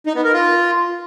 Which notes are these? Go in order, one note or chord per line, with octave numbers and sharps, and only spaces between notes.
D#4
B3
A#4
F4